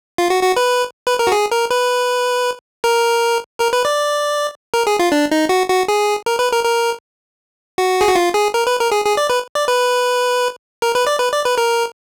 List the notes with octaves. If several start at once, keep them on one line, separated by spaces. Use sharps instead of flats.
F4
F#4
F#4
B4
B4
A#4
F#4
G#4
A#4
B4
A#4
A#4
B4
D5
A#4
G#4
F4
D4
D#4
F#4
F#4
G#4
A#4
B4
A#4
A#4
F#4
G#4
F#4
F4
G#4
A#4
B4
A#4
G#4
G#4
D5
B4
D5
B4
A#4
B4
D5
B4
D5
B4
A#4